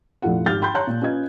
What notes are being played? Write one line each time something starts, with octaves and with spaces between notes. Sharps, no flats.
F1 A#1 A3 E4 F4 F#5
G#1 G4 F6 G6 A6
G5 B5 C6 G6
C#5 A5 A#5 C6 F#6 G6
A#2
C#4 F4 B4 D#5 G#6